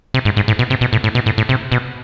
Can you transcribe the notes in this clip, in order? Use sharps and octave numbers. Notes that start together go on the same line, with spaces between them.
C3
G#2
G#2
A2
B2
C3
B2
A2
A2
B2
A2
A2
C3
B2